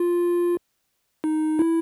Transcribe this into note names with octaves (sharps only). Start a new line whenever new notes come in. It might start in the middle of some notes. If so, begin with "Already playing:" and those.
Already playing: F4
D#4
E4